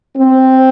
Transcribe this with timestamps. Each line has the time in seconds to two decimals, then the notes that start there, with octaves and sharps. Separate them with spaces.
0.17 C4